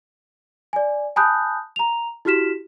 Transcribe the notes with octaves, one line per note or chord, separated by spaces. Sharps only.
D5 G#5
G#5 A5 B5 D#6 F#6 G6
A#5 F7
E4 F#4 G4 F6 B6 E7